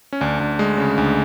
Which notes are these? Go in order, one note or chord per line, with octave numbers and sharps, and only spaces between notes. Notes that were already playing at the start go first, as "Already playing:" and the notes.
C#4
D2 D4
D2
G#3
C#3
D2